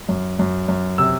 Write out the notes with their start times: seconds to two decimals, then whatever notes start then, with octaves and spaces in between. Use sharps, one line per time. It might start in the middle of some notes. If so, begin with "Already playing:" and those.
0.09 F#2
0.39 F#2
0.68 F#2
0.98 C3 E6